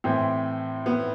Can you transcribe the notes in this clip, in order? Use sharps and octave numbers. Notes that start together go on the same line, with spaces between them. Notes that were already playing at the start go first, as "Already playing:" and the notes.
A2 E3 C4
B3